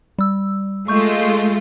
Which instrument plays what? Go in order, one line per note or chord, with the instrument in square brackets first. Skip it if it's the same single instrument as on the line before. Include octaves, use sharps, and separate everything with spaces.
[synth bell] G3 E6
[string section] G#3 A3 F4 [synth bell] C#6 G6